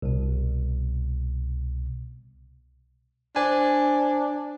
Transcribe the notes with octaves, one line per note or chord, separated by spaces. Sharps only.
C2 B2
D4 C5 G#5